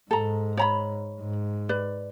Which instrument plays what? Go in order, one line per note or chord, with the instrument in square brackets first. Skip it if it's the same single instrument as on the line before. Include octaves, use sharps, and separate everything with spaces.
[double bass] G#2 [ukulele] A4 A#5
[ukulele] C#5 A#5 B5
[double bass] G#2
[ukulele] B4 D5